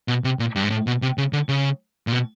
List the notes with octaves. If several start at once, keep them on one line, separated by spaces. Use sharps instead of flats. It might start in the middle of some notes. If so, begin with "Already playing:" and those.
B2
C3
A#2
G2
G#2
A2
B2
C3
C#3
D3
C#3
A#2
B2